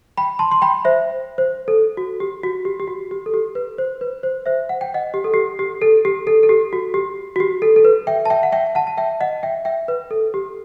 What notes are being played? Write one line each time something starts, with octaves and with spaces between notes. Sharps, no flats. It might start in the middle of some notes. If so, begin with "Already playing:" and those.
G5 B5
A5 C6
C6
G5 B5
C5 E5
C5
A4
F#4
G4
F#4
G4
G4
F#4
G4
A4
G4
B4
C5
B4
C5
C5 E5
F#5
G5
D#5 F#5
G4
A4
G4
G4
A4
G4
A4
A4
G4
F#4
G4
F#4
G4
A4
A4
B4
E5 G5
A5
E5 G5
F#5
E5 G5
F#5 A5
A5
E5 G5
D#5 F#5
E5 G5
E5 G5
B4
A4
G4